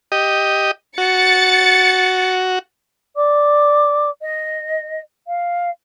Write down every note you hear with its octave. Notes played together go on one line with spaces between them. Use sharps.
G4 D#5
F#4 A6 C#7
D5 D6
D#5
F5